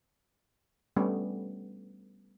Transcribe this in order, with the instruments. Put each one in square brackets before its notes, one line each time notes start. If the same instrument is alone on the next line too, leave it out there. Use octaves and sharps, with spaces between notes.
[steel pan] G3 A3 B3 C#4